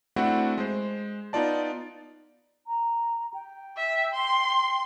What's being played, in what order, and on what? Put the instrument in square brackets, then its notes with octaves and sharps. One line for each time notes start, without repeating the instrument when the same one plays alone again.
[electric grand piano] A3 C4 D4 E4 F#4 F#5
G#3 C5
B3 D#4 F4 D5 A5
[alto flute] A#5
G5
[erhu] E5
C6